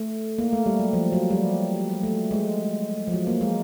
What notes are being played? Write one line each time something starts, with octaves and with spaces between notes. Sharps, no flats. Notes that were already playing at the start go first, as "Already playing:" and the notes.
Already playing: A3
A#3
A3
G3
F#3
F3
F#3
G3
A3
G#3
F3
F#3
A#3
G#3